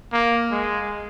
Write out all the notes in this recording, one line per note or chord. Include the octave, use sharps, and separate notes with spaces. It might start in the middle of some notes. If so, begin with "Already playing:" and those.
A#3
G#3